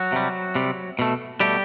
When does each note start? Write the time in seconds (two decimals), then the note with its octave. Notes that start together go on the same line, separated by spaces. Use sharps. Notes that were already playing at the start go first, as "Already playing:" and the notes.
Already playing: F#3 F#4
0.12 C3 G3
0.55 C3 G3
0.99 B2 A3
1.40 B2 G3 A3 G4